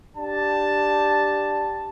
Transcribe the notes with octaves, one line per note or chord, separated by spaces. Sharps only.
D4 G4 A5